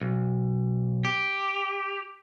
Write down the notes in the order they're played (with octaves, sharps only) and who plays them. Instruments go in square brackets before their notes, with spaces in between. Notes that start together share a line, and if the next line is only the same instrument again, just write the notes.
[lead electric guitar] B1
G4